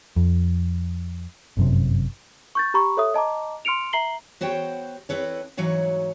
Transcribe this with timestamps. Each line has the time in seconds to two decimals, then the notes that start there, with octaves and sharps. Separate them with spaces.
0.16 F2
1.57 G1 F#2 C3
2.55 C#6 G6 A6
2.74 G4 A#5 B5 C#6
2.97 A4 C#5 E5 D#6
3.14 D#5 A5 A#5 D6
3.65 C6 F6 C#7 D7 F7
3.93 E5 A#5 C7 F#7 G7
4.41 B3 F#4 C5 C#5 G5
5.09 C4 E4 A4 B4 C#5
5.57 G#2 E3 F#3 F#4 C#5 F5